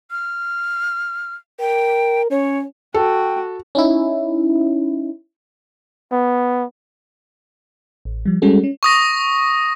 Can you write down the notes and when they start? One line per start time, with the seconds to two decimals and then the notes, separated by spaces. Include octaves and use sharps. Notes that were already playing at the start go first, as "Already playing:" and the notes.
0.11 F6
1.60 A#4 G5
2.31 C#4 C#5
2.94 F#4 A4 G5
3.75 C#4 D#4 E4
6.12 B3
8.05 A1
8.25 F3 G3
8.42 G3 G#3 C#4 F#4 G#4 A4
8.64 C#4
8.83 C#6 D#6 A#6